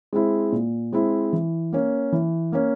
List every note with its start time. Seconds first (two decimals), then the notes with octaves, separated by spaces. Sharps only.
0.13 G#3 C4 E4
0.52 A#2
0.93 G#3 C4 E4
1.33 E3
1.73 A#3 C#4
2.12 E3
2.52 A#3 C#4